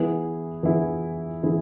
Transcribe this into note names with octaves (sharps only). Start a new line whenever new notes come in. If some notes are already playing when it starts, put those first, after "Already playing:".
Already playing: E3 B3 E4 G#4
E3 B3 E4 G#4
E3 B3 E4 G#4